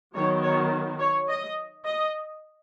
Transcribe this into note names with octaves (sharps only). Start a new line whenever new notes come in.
D#3 F#3 B3 C#5
C#5
C#5
D#5
D#5